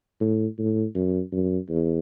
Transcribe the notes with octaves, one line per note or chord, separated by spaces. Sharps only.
A2
A2
F#2
F#2
E2